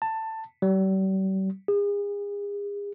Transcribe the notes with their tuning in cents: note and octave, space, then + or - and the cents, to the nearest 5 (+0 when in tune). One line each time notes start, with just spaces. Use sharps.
A5 +15
G3 -45
G#4 -40